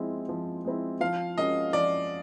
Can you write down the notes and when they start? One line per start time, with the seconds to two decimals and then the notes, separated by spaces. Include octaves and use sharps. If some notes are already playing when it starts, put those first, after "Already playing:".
Already playing: F3 G#3 C4 E4
0.29 F3
0.65 G#3 C4 E4
1.01 F3 F5
1.37 G#3 C#4 F#4 A#4 D#5
1.73 F3 D5